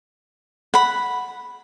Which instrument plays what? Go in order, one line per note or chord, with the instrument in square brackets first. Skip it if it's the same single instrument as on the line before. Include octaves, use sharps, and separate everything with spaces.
[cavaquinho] F#5 B5